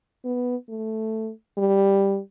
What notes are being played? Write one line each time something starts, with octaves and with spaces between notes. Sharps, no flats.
B3
A3
G3